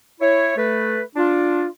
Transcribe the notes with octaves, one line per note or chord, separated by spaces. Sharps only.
E4 C#5
A3 B4
D4 F4